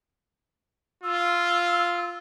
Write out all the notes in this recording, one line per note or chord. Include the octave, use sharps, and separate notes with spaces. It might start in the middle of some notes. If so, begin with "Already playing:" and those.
F4 E6